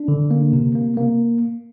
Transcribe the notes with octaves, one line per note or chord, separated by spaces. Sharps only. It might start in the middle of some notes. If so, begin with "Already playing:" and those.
Already playing: D4
D3
A#3
C3
A#3
A#3